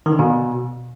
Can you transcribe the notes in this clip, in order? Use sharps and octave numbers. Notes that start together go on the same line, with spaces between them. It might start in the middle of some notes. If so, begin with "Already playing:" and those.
D#3
D3
B2